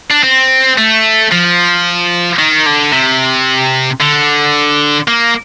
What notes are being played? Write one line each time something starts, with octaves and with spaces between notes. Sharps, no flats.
D4
C4
A3
F3
D#3
D3
C3
D3
A#3